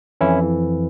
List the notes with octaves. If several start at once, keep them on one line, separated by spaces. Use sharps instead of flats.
F2 E3 C#4 E4